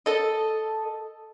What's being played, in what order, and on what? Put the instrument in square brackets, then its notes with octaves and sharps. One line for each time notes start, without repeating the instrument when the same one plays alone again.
[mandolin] A4 D#5